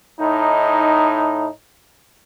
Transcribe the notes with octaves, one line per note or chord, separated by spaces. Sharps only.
A2 D#4